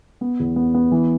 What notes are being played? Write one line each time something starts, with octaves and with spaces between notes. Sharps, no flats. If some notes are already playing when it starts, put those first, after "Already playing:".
B3
E2
B3
B3
E3